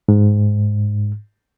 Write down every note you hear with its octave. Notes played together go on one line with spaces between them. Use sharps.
G#2